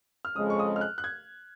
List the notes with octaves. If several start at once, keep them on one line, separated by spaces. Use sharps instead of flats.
F6
F2 C#3 G#3 D#6
C#6
D#6
F6
F#6
F#6
G#6